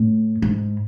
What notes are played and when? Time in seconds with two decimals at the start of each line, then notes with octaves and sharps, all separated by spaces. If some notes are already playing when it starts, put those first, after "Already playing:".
Already playing: A2
0.42 G#2